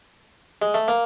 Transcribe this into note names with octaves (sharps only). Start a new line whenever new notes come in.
G#3
A3
A#3